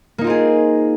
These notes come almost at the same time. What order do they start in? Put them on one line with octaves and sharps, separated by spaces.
A#3 D#4 F4 C4 G#4